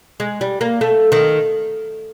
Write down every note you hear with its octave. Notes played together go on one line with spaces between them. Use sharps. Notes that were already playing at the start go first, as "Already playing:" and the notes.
G#3
G3
A#3
A3
D#3